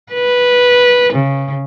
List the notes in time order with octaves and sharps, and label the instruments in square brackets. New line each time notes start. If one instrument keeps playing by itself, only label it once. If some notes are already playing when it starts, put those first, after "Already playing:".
[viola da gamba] B4
C#3